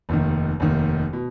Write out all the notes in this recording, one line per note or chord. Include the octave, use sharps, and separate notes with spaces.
F1 D#2 D#3
F1 D#2 D#3
B2